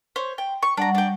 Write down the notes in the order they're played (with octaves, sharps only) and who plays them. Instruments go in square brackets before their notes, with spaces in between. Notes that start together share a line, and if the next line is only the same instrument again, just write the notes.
[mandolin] C5 C#5
G5
C#6
[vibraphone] G3 F#5 [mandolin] D4 A#5
[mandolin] D4 G5